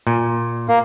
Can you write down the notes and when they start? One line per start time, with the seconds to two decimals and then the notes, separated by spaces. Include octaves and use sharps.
0.07 A#2
0.68 A#3